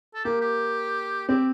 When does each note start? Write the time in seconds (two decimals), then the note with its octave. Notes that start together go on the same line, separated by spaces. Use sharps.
0.15 A4
0.25 A#3 G4
0.41 G4
1.29 C4 G4